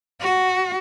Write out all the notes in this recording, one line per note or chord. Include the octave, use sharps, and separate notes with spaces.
F#4